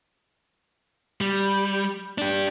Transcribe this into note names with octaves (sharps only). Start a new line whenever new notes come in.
G3
D4 G4